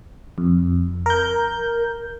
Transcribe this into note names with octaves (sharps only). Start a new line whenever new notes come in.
F2
A#4 G6